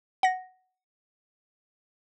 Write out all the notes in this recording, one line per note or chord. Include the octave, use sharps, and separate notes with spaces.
F#5 A#6